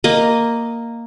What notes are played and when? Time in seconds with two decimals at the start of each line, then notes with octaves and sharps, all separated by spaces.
0.04 A#3 D#5